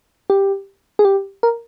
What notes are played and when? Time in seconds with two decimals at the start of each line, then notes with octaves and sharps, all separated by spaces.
0.30 G4
0.99 G#4
1.05 G4
1.43 A#4